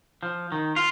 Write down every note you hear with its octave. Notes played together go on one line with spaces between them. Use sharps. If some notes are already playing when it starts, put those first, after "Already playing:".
F3
D#3
F4